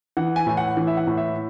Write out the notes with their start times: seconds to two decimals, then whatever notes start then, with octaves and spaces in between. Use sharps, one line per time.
0.17 E3 F#5
0.36 G#5
0.47 A2 G#5
0.57 F#5
0.77 E3
0.87 E5
0.97 F#5
1.07 A2
1.17 E5